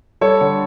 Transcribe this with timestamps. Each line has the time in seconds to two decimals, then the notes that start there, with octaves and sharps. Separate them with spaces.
0.21 G3 A4 C#5
0.41 D3